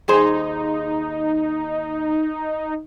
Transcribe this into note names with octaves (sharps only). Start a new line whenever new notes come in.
D#2 D#4 G#4 C5